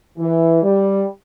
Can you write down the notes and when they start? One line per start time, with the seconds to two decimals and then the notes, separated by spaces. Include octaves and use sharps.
0.18 E3
0.63 G3